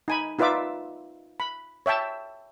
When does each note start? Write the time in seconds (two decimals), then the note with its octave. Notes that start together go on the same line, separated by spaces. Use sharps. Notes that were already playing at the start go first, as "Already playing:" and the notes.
0.08 D#4 G#5 B5
0.39 D#4 F4 B4 D5 E5 D6
1.40 B5
1.86 C#5 E5 G5 A5